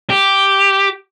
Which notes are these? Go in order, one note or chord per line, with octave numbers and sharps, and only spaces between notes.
G4